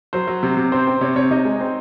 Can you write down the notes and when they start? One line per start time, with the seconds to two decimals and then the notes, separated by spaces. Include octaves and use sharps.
0.13 F#3 C5
0.28 F#3
0.43 C3
0.57 C3
0.72 C4 C5
0.87 C4
1.01 C3 C#5
1.16 C3 C#5
1.31 C3 D#4 D#5
1.45 G#3
1.61 C4